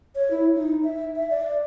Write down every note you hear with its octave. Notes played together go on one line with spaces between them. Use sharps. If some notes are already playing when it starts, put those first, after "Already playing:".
C#5
E4
D#4
E5
E5
D5